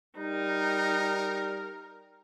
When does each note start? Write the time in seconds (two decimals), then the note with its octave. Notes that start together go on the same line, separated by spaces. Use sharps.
0.18 G3 D#4 A#4